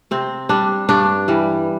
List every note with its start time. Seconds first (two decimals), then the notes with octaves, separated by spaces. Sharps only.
0.11 C3 C4
0.49 G3 D4
0.89 G2 D4
1.28 E3 G3